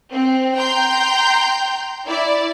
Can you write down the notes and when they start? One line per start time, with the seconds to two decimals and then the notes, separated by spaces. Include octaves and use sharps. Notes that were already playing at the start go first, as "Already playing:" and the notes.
0.12 C4
0.56 G5 A#5 C6 G6
2.07 E4 D5